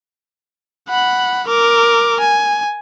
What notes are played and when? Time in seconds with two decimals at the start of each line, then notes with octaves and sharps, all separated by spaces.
0.89 F#5 B5
1.48 A#4 D6
2.20 G#5